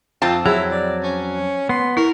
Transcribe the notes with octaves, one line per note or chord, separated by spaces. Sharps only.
F2 C4 F4 A5
F#3 E4 G#4
D5
C#4
B3 C6
E4 A#4